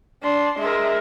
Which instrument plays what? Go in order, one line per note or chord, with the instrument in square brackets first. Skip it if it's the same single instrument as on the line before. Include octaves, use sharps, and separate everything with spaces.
[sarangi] D4 [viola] C6
[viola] G#3 A#4 [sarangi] E5